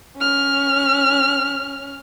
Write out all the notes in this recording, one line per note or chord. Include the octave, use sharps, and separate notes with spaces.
C#4 F6